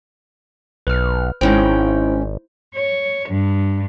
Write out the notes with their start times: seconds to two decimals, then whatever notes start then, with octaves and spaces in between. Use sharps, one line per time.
0.87 B1 B4 F6
1.41 G#1 G#3 C#4 D#4 E4 C5 G5
2.74 C#5
3.28 G2